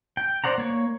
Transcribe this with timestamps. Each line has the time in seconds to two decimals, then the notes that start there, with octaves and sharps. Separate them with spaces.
0.17 G5
0.44 C5 D5 F#5 A#5
0.58 A#3 C#5